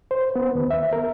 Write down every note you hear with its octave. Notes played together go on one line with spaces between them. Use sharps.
C5
B3
D#2
E5
A#4